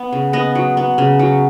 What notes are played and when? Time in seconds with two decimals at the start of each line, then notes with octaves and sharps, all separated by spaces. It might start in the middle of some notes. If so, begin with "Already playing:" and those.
Already playing: B3
0.13 C#3
0.33 B3 D#5
0.55 F#3
0.77 B3
0.98 C#3
1.19 F#3